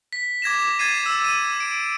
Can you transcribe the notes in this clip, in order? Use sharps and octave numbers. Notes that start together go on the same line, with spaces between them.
B6
D6 G#6 A#6 E7
G#6 A6 C7 D#7
E6
D#7
D7